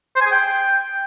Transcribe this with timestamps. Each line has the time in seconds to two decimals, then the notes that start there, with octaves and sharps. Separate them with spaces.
0.16 C5
0.21 G#5
0.26 G#4
0.31 G5